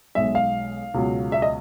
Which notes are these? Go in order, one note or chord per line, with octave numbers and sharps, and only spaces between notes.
B1 B2 G#3 E5
F5
C#2 B2 F#3
E5
D#5